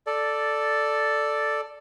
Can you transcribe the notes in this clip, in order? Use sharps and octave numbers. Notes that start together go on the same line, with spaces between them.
A4 D5